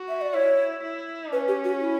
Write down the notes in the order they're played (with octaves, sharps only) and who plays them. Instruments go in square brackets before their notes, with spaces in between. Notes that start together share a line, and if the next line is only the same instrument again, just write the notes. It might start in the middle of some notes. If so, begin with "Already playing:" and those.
Already playing: [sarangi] F#4
[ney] E5
D5
[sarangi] E4 [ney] C#5
[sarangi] E4
[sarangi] C#4 [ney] B4
[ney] G4
F#4
E4